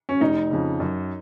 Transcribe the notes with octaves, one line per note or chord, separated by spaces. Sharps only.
C#4
F1 D#4
F2 C#3
F#2